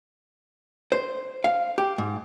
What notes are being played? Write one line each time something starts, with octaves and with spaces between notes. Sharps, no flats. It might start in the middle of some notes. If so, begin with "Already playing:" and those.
C5
F5
G4
G#2